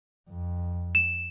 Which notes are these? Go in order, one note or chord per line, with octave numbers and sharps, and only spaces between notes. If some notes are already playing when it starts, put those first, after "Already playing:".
F2
E7